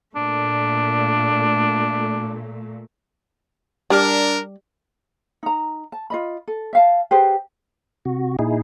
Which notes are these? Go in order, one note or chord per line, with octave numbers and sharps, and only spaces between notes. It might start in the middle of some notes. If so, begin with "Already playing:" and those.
A#2 A3 D4
G3 D4 A#4
D#4 A#5
A5
F4 D#5 B5
A4
E5 F5 A5
G4 G#4 B4 C5
C3 F#4
A#2 D#4 E4 G#4